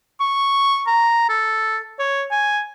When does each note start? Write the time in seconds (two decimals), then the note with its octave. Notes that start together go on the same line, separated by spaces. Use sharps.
0.20 C#6
0.87 A#5
1.29 A4
1.99 C#5
2.31 G#5